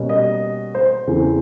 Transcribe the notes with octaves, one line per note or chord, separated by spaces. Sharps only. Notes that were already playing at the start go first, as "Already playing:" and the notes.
Already playing: B2 G3 A#3 C#4
D#5
C5
E2 C#3 E3 A3 C4